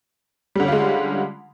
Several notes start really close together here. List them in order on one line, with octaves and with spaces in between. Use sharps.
G3 D3 C#4 F4 G#3